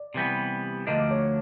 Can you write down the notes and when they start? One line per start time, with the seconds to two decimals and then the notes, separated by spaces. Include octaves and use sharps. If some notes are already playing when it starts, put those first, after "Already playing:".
Already playing: D5
0.14 C3 E3 G3 B3
0.87 D2 D3 F3 A#3 D4 D#5
1.11 C#5